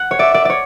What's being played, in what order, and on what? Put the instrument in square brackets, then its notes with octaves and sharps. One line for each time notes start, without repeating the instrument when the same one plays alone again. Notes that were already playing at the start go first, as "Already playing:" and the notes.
Already playing: [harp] F#5
C#5
[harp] D5 [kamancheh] E5
[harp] D5
C#5 D5